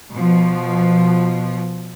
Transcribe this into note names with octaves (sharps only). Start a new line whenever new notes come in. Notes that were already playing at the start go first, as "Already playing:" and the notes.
B2 F3